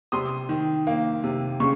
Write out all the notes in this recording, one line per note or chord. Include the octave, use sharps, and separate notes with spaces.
C3 C6 D#6
D#3
A#3
C3
C#3 C#6